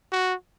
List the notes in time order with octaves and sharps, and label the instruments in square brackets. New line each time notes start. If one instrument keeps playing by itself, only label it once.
[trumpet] F#4